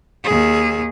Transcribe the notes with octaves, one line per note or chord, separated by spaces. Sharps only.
D#2 G#4